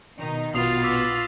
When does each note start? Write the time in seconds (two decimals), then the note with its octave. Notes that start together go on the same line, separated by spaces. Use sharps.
0.18 B2 D#3 D#4
0.55 A#1 B2 B3 F4 D#6 A6 C7 F7
0.84 D6 E6 B6